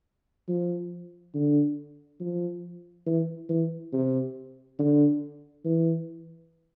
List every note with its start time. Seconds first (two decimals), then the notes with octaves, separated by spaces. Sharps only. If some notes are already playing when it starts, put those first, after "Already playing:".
0.48 F3
1.34 D3
2.20 F3
3.06 E3
3.49 E3
3.93 C3
4.79 D3
5.65 E3